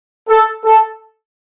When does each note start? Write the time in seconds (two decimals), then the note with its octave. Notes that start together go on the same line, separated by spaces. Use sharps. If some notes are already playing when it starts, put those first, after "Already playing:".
0.29 A4
0.65 A4